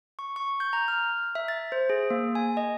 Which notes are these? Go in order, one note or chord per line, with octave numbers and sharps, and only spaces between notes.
C#6
C#6
G6
A#5
F6
E5
A6
C5
G#4
A#3
G#5
D#5